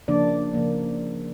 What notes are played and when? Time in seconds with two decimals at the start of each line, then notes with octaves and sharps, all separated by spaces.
0.08 C#3 F3 A#3 D4 D5
0.54 C#3 F3 A#3